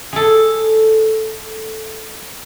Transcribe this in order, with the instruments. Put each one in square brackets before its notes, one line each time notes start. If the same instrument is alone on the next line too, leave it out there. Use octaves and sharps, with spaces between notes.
[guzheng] G#4 A4